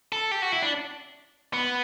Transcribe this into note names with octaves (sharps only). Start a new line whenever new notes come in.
A4
G4
F#4
E4
D4
B3